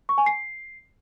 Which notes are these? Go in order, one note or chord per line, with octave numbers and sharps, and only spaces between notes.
C#6
G#5
C7